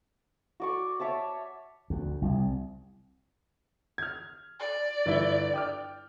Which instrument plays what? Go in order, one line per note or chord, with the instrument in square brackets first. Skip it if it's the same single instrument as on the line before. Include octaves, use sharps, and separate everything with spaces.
[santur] F#4 D5 C#6
C#5 E5 A5 D6
[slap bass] D2
C2
[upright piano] F6 G#6
[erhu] D5
[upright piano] G1 E4 G7
G5 D6 F6